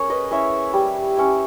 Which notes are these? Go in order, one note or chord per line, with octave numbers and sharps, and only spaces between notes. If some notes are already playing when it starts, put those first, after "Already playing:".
Already playing: A#3 C#4 G#4 C#5
B4 D#5
C#4 E4 C#5 E5
G3
C#4 E4